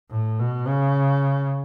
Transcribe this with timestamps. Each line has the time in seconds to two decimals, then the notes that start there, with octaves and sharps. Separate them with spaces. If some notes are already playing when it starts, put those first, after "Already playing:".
0.10 A2
0.39 B2
0.67 C#3